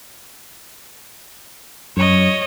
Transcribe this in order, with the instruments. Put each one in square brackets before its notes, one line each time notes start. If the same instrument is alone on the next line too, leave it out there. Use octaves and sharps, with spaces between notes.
[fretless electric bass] F#2 [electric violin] C#5 D#5